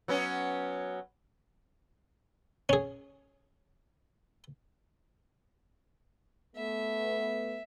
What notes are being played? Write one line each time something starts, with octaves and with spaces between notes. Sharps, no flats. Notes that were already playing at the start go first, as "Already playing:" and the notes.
F#3 B3 C#4
C#4 G#4
A3 B3 E5